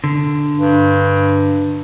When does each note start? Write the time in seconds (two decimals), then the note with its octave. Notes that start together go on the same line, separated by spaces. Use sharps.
0.04 D3
0.57 G2